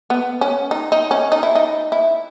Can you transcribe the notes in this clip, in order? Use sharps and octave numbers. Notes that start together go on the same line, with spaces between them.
B3
C#4
D#4
D#4
C#4
D#4
E4
D#4
E4